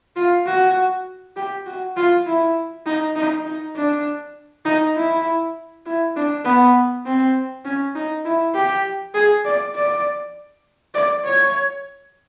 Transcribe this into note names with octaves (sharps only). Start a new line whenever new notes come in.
F4
F#4
G4
F#4
F4
E4
D#4
D#4
D#4
D4
D#4
E4
E4
D4
B3
C4
C#4
D#4
E4
G4
G#4
D5
D5
D5
C#5